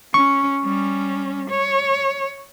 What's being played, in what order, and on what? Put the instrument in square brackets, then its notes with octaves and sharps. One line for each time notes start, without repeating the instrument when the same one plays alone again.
[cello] C#4 [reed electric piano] C#6
[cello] G3 C#4
C#5